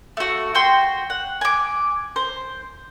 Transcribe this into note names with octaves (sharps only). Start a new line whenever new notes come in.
A3 F#4
F#4 G5 C6
F#5
G#5 D6
C5